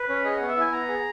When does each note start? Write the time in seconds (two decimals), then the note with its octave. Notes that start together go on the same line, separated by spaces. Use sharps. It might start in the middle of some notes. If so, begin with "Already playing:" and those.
Already playing: B4
0.09 C#4
0.24 G#4 D#5
0.36 B3 F#5
0.48 E5
0.57 E4 G#5
0.72 B3 A#5
0.88 G#4